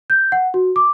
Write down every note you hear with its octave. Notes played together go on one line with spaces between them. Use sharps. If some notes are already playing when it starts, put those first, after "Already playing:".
G6
F#5
F#4
D6